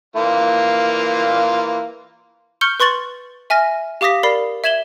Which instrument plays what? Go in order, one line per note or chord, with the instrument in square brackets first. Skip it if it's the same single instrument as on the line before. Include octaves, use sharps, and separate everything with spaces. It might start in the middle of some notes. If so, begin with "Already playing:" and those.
[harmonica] E3 A#3 F4
[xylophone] C#6 F6 G6 C#7 G7
B4 C6 C#6 A6 F#7
E5 G#5 F6 A#6
G4 F5 D6 D#6 A#6 B6
A#4 D5 B5 C7
E5 G#6 E7 F#7 G7